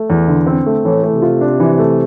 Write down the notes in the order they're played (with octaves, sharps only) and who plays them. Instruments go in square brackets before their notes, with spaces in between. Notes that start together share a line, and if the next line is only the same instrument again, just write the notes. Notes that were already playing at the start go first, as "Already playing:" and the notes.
Already playing: [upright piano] A3
E2
D3
C4
A3
[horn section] A2 [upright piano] E3
[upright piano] A3
[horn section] C3
[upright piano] F4
D4
E3
A3